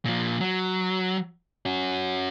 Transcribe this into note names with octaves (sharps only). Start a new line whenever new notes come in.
A#2 F3
F#3
C#4 F#4